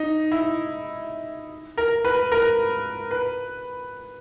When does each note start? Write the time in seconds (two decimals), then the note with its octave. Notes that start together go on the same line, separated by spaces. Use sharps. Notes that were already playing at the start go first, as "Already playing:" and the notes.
Already playing: D#4
0.32 E4
1.78 A#4
2.04 B4
2.32 A#4
3.11 B4